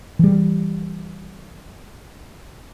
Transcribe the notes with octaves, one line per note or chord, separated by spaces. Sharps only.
E3 G3